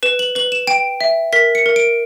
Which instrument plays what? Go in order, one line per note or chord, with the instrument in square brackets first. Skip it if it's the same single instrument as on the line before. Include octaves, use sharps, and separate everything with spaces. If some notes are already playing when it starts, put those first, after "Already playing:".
[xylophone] B4 E7
F#7
B4 F#7
E7
G5 D7
E5
A#4 B6
C#7
A#4
D7